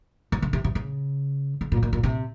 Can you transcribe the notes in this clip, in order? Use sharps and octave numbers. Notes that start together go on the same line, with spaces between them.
C3
C#3
C3
C3
C#3
C#3
A#2
A#2
A#2
C3